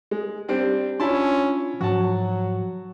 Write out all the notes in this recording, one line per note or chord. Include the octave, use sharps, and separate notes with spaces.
G#3
G3 C4 D4
C#4 D4 E4 F4 A5 C6
G#2 F3 F#3 F#4 A5